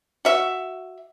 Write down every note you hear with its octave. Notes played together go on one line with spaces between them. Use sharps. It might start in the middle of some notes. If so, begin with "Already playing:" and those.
F#4 E5